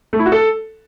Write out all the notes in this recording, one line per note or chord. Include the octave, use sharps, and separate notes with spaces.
A3
E4
F#4
A4